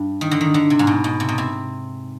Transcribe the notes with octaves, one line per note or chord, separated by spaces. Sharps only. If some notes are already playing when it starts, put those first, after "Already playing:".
Already playing: G2
D#3
D3
D#3
D3
C3
G#2
B2
B2
C3
B2
C3